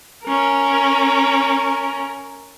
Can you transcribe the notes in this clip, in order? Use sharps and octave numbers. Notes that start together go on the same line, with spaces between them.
C#4 A#4